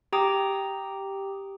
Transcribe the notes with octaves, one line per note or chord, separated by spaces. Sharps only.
G4 G5 A#5 D6 D#6